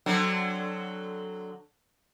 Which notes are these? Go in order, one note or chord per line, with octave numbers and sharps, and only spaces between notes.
D3 F#3 C4